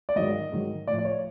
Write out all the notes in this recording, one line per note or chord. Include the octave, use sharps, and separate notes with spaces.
D5
G#2 D#3 F#3 D#5
G#2 D#3 F#3
A2 F3 D5
D5
C#5